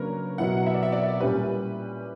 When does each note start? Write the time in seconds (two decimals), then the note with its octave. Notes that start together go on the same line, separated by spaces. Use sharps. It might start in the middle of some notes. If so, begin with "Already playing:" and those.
Already playing: C#3 F#3 A#3 D4 A#4 B4 C#5
0.38 B2 F#3 B3 E4 F#5
0.66 E5
0.74 D5
0.83 E5
0.92 D5
1.20 A#2 G3 C#4 E4 G4 B4